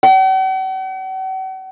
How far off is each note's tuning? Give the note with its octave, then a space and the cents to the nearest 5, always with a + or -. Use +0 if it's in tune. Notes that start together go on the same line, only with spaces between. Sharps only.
F#5 +45